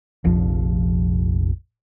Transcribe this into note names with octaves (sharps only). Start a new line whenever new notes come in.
F1 A#1 F2 F3